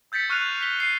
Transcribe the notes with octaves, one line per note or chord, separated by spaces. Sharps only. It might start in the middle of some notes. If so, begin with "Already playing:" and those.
E6 G6 A6 B6 C#7
C#6 F6 F#6 C7 D#7 F7
B6 G7
C7 D#7